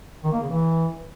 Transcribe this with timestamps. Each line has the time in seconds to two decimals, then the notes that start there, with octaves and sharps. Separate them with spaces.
0.24 D#3
0.33 A#3
0.41 C#3
0.50 E3